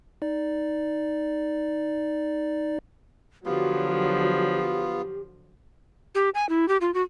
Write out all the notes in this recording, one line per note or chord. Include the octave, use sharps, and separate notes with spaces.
D#4 D5
D3 F3 F#3 B3 F4 G4
G4
G#5
E4
G4
F4
F#4